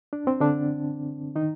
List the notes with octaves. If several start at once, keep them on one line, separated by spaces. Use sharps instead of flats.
D4
C4
D3 D4
D#3 D#4